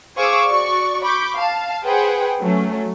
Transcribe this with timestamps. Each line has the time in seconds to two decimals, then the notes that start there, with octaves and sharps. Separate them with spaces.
0.16 G#4 C5 F5 C#6 D6 E6
0.48 F#4 D5 C#6
1.04 B5 C#6 D6 G6
1.35 F5 A5
1.85 G#4 B4 C5 F#5 G5
2.40 F#3 A3 C#4